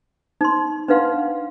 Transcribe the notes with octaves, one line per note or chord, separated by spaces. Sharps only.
D#4 C6
D4 D#4 B4 F5 F#5 C6